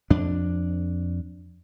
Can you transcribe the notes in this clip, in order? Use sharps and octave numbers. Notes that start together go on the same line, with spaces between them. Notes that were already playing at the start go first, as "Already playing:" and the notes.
F2 D4